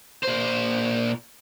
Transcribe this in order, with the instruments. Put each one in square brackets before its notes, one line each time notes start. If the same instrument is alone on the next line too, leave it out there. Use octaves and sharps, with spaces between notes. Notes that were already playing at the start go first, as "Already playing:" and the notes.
[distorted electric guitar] A#2 C5